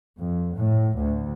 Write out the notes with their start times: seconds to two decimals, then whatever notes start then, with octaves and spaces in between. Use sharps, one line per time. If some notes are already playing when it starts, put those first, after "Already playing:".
0.19 F2
0.56 A2
0.97 D2